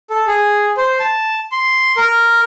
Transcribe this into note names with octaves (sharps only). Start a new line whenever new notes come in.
A4
G#4
C5
A5
C6
A#4